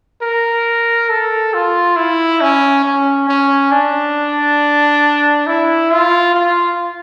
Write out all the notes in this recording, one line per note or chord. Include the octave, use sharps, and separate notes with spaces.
A#4
A4
F4
E4
C#4
C#4
C#4
D4
E4
F4
F4